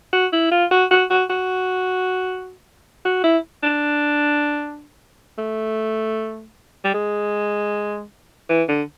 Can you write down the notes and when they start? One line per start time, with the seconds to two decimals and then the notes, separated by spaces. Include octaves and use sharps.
0.13 F#4
0.33 E4
0.51 F4
0.71 F#4
0.91 F#4
1.10 F#4
1.30 F#4
3.05 F#4
3.24 E4
3.63 D4
5.38 A3
6.84 G3
6.94 G#3
8.49 E3
8.69 D3